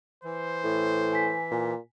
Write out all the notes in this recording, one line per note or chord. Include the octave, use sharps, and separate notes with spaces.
E3 C5
A2
G#5 B6
A#2